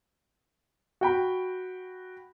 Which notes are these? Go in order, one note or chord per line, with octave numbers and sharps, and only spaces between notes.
F#4 G5 B5